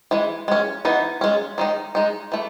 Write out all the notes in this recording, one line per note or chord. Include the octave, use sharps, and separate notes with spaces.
E3 G#3
G#3 C#4
E3 B3 D#4
G#3 C#4
D#3 G#3 D#4
G#3 D#4
E3 A3